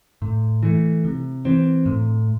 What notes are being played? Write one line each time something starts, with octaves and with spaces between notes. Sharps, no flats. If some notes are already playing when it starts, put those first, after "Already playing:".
A2
E3 A3
C3
E3 C4
A2